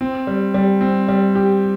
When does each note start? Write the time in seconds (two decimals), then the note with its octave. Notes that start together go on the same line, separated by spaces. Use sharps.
0.01 C4
0.27 G3
0.54 G3
0.81 C4
1.08 G3
1.35 G4